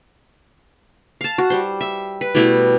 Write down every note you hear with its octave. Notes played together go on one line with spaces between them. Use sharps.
F5 A5
F#4
G3 C5
E5
B4
B2 G3 A3 E4